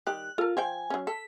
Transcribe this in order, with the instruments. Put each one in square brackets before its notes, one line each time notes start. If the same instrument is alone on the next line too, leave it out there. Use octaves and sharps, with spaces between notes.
[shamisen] D#3 G3 G4 [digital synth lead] F#6
[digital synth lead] F4 [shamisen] A4 A#4
[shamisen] F3 C5 G5 [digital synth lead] G#5
[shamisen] F#3 C#4
[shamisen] A4 [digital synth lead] B6